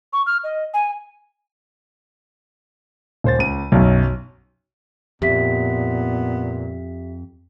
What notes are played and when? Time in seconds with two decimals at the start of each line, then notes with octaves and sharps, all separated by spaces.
0.13 C#6
0.26 F6
0.44 D#5
0.74 G#5
3.24 D#1 C5 A6
3.39 C#2 D#7
3.72 B1 F#2
5.22 F2 A#2 B3 G4 E5 B6